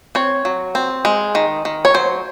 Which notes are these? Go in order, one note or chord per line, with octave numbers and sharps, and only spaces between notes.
C4 C#5
F#3
C4
G#3
D#3
D#3
C#5
F#3 C5